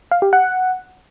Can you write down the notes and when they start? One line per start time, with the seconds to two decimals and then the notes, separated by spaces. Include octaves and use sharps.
0.12 F5
0.22 G4
0.33 F#5